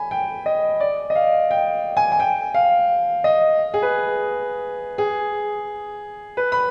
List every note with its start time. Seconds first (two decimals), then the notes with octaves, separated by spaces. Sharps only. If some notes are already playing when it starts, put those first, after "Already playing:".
Already playing: G#5 B5
0.11 G5
0.46 D#5
0.80 D5
1.10 D#5
1.15 F5
1.51 G5
1.97 G#5
2.12 G#5
2.20 G5
2.54 F5
3.24 D#5
3.74 G#4
3.82 B4
4.98 G#4
6.37 B4
6.52 B5